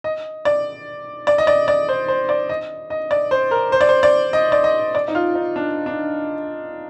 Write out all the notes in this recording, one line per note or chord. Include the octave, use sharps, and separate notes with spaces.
D#5
D5
D5
D#5
D5
D5
C5
C5
D5
D#5
D#5
D5
C5
A#4
C5
D5
C5
D5
D#5
D5
D#5
D5
D#4
F4
D#4
D4
D4